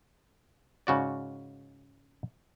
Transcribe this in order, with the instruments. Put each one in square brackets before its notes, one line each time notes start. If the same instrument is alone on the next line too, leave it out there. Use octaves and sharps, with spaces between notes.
[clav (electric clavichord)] G#2 C#3 F#4 D5